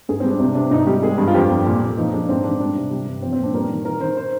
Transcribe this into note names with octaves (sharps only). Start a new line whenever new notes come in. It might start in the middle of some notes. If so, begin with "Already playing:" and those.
G#2 G#4
G3 C4
D4
C3 C4
C3 D4
G#2 D#4
G3 G4
G#3 G#4
G2
F4
F2 G4
G3
A#2
A#2
F3 D#4
G#3 D4
G#2 C4
D#3 D4
G3 D4
C3
G3
G2
F3 C4
C4
A#2 D4
G3 A#4
D#3
D#3 A#4
D#3 C5
C5